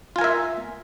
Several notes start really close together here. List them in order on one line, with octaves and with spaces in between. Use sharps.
F4 G#5 A#4 E5